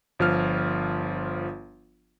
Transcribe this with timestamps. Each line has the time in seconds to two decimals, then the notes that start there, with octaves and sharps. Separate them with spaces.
0.19 G1 F3 F4 F6